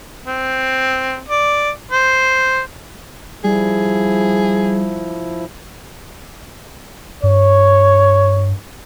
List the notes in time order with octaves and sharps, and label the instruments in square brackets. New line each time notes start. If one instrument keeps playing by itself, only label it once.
[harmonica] C4
D5
C5
[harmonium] F3 E4 [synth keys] G3 [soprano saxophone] G#4
[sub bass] G2 [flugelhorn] C#5